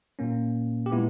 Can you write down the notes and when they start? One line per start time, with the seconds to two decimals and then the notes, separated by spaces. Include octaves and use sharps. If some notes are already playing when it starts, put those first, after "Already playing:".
0.19 A#2 A#3 C#4
0.86 G4
0.92 A#2 G#3 B3 E4